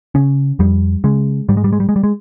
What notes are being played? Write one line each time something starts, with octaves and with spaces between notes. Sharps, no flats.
C#3 C#4
F2 G3
C#3 G#3
G#2 G3
G#3
G3
G#3
G3
G#3
G3
G#3